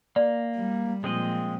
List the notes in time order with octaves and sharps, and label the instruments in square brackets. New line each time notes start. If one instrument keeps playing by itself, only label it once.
[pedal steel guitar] A#3 [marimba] D5
[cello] G3
[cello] A#2 F3 [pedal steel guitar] G#3 C4 D#5